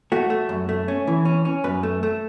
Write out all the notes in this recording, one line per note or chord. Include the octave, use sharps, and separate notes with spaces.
A3 F#4
A3
F#2
A3
C#4
E3
C#4
C#4
F#2 B4
A3
A3